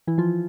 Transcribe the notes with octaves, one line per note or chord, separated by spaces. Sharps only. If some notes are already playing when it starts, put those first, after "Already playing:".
E3 E4
F3 F4